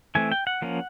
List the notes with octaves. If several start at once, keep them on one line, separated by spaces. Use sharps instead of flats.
E3 A3 C4 G#5
G5
F#5
F3 A#3 C#4